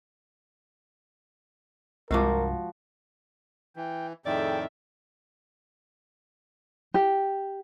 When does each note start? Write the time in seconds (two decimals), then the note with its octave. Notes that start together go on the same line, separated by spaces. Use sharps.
2.11 C2 G2 F3 G#3 F#4 A#4 C#6 D6
3.76 E3 G5
4.26 F2 A2 D#3 G#4 A4 D5 E5 G5
6.94 G4